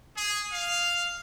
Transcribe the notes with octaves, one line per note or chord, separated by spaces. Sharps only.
G#4
F5